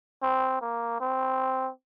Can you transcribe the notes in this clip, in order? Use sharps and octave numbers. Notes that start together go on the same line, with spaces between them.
C4
A#3
C4